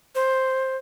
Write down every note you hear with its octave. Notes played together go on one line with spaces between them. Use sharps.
C5